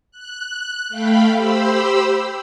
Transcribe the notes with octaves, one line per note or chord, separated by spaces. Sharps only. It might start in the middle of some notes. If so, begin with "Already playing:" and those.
F#6
A3 F5 G5 B5
G4 C5 B5 E6